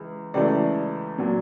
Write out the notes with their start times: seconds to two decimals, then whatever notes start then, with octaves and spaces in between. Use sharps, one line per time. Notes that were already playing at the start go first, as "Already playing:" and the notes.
Already playing: C#2 E3
0.34 C#2 C#3 E3 A3 D5
1.18 A#2 F#3